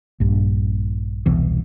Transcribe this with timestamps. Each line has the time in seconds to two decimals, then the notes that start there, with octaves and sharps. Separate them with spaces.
0.20 A#1 G2
1.26 E1 C2 B2 E3